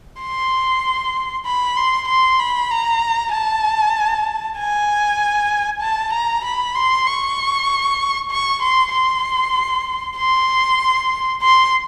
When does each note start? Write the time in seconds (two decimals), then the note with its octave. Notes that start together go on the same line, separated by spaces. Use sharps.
0.21 C6
1.46 B5
1.76 C6
2.08 C6
2.39 B5
2.71 A#5
3.32 A5
4.57 G#5
5.81 A5
6.13 A#5
6.44 B5
6.75 C6
7.07 C#6
8.30 C#6
8.62 C6
8.93 C6
10.17 C6
11.42 C6